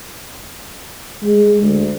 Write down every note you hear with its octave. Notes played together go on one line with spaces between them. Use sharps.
G#3
D2